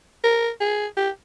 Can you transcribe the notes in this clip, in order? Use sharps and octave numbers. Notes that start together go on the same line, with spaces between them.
A#4
G#4
G4